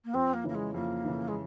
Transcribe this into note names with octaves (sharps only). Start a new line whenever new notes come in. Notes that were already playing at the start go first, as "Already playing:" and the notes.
A#3
F2 C4
A#3
C#3 E3 A#3
G#3
F2 A#3
C#3 E3
G#3